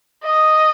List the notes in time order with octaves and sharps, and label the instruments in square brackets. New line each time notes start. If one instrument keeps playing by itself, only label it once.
[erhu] D#5